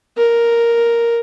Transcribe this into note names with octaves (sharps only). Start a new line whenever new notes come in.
A#4